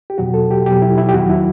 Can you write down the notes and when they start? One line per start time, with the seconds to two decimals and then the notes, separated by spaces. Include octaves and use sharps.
0.10 G4
0.18 E2 B2 F#3 F#4
0.34 A4
0.51 G4
0.66 E2 B2 F#3 G4
0.82 E4
0.97 E4
1.09 G4
1.13 E2 D#3 F#3 F#4
1.30 E4